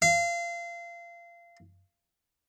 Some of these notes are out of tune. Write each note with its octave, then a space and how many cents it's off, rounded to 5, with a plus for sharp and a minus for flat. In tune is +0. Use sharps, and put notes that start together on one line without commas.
F5 -25